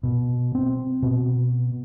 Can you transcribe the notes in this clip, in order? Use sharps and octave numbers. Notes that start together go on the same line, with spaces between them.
B2
C4
B2